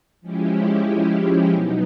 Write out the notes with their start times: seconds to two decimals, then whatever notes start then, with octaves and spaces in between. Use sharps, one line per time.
0.21 F3 G#3 C#4 E4 G4
1.51 B2 F#3 B3 D#4